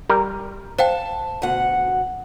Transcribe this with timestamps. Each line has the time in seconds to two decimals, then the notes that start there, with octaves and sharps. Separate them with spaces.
0.09 G3 A#4
0.79 C5 F5 G5 A5
1.42 D2 B2 F#5